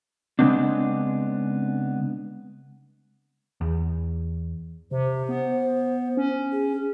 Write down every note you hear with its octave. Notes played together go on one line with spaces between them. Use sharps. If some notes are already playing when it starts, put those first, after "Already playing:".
C#3 G#3 B3 C4 D4
E2
C3 C5
B3
C#4
G#4